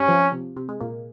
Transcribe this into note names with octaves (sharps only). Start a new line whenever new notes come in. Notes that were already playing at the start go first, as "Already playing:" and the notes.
Already playing: G2 G3 C#4
F2 F3
C3
C3
G#3
A#2 A#3